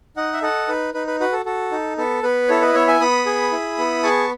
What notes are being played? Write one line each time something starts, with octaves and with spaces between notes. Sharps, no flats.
D#4 D#5 F#5
E5
A4 D#5 F#5
D#4 B4
D#4 B4
B4
F#4 B4
A4
F#4 A4
D#4
B3 A4
B3 B4
E4 A4 C#5
B4 D#5
B3 C#5 E5
E5 G#5
B3 B5 D#6
G#4
E4
B3
G#4 A5 C#6